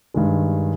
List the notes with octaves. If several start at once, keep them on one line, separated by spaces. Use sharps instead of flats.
G2 D#3 G#3